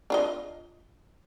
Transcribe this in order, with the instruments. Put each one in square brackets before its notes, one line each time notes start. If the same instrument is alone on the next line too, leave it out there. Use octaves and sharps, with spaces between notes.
[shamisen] D4 F4 D#5